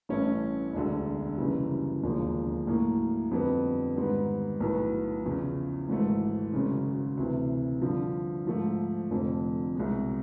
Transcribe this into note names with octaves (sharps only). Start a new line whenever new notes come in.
A1 G2 E3 A3 C#4
E1 D2 D3
F#1 F#2 C#3 E3 G3
E1 D#2 D3 F3
A2 F#3 A#3
F2 D3 G3 B3
G#2 D#3 G3 B3
B1 A2 F#3 B3
E2 C#3 F3
G#1 G#2 E3 A3
G#1 F#2 C#3
D2 C3 E3
G2 D3 F3
G#2 F3 A3
F1 F2 D3
C2 B2 G#3